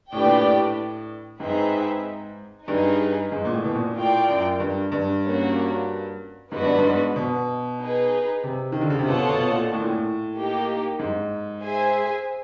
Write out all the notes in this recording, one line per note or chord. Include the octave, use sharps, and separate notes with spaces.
A2 D4 G4 B4 D5 G5
A#2
A2
G#2 C4 D#4 G#4 B4 E5
G2 D#4 G#4 B4
G#2
A#2
A2
B2
A#2
A2 F4 A#4 D5 G5
F#2
G2
G2
A#3 C#4 F#4
G#2 B3 D4 F#4 B4
G2
G#2
B2
D#4 G#4 B4
C3
D#3
D3
C#3
C3
B2 F4 A4 C#5 F#5 A5
B2
A#2
A2
A#2
A2
A#3 D#4 G4
G#2
G#4 C5 E5 G#5